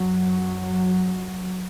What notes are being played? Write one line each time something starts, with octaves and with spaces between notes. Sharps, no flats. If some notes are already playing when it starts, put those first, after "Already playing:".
Already playing: F#2 F#3